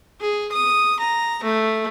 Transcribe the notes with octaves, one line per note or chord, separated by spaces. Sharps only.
G#4
D#6
A#5
A3